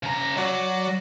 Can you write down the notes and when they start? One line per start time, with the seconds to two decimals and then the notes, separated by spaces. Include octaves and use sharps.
0.03 C#3 A#5
0.37 F#3 F#4 D5